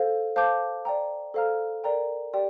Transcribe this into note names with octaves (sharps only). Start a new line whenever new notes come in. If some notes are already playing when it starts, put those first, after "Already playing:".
Already playing: A4 C5 F5
C5 F5 A5 D6 G6
D5 G5 A#5
A4 C5 F5 A#5 F6
A#4 D5 G5 A#5
G4 D5 G5 C6